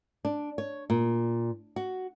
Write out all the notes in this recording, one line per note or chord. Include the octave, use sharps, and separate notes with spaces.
D4
C#5
A#2
F#4